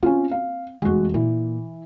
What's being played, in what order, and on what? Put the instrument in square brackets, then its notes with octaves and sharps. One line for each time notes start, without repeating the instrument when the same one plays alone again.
[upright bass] C4 [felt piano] C#4 F4
[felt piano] F5
[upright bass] F1 E2 [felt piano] G#3 F#4
[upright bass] A#2 [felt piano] E3